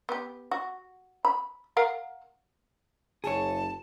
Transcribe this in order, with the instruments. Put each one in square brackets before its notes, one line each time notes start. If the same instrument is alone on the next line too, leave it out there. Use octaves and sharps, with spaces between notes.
[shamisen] B3 G4
F#4
B5
A#4 F5 F#5
[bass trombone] F#1 [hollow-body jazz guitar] G#4 C#5 [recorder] A5